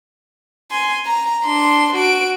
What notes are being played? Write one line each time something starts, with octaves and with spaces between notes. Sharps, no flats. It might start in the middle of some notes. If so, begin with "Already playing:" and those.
G#5 C6
A#5
D4 C6
F#4 D7